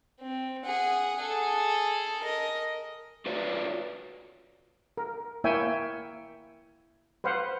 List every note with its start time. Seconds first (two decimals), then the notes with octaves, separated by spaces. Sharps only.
0.20 C4
0.65 G#4 F#5
1.18 G#4 A4
2.21 A#4 D#5
3.26 F4 F#4 B4 C#5 D5
4.97 A#4
5.44 A#3 E4 C#5 E5 G5 G#5
7.24 B4 C5 F5 F#5